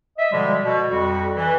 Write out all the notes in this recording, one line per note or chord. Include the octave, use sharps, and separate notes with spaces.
D#5 E5
B2 D3 F3 G3 G#3
B2
F2 G3 F#4
E3